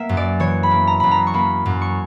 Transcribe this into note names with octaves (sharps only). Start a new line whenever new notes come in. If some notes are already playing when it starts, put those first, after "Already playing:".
Already playing: A#3 E5 F#5
F#2
D5
E3 C#5
B5
A#3
A#5
F#2 B5
A#5
C#6
A#3 B5
F#2
C#6